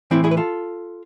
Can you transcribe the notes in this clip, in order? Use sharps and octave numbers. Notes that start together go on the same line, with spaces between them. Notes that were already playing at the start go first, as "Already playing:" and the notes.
A2 E3 C4 E4
E4 G#4
B4
F4 A4